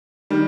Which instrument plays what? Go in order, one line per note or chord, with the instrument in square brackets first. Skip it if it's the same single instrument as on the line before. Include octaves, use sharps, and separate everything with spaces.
[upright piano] D#3 G3